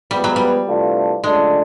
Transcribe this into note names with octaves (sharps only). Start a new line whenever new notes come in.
F3 G3 G#3 B3
F#3
G3
C3 E3 A3 D4 F4
C#3 F3 G#3 A3 D4